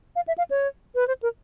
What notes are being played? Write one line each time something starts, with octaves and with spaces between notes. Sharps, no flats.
F5
E5
F5
C#5
B4
C5
A#4